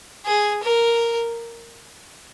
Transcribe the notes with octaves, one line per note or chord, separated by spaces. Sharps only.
G#4
A#4